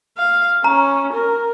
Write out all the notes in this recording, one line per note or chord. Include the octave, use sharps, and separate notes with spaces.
F5
C#4 A#5
A#4